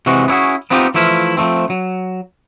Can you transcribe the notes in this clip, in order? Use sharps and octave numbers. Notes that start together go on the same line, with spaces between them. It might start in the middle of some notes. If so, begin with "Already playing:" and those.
C3 E3 G#3 F#4
B3 C#4 E4 F#4 G#4
B3 C4 D#4 F4 G4
E3 F3 A3 E4 F4
F3 F#3 A3 C4
F#3